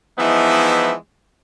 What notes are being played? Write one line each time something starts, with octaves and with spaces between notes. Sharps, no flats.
E3 F3 G#3 B3 D#4 E4